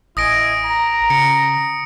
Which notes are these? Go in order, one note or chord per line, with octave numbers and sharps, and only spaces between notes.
A1 E4 D#5 G#5 D#6 A#6 D7
A#5
C#3 C#7